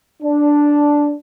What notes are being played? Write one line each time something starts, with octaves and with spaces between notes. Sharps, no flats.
D4